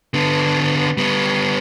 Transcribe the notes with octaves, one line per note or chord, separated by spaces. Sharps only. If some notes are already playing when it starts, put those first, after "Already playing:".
D3 B3
G3 B3